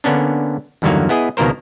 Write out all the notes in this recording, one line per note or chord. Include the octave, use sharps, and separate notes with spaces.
D3 A#3 B3 C#4 D4
E2 G2 D3 D#3 F#3 A#3
B3 E4 G#4 D#5
C#2 B2 D#3 A#3 A#4 C5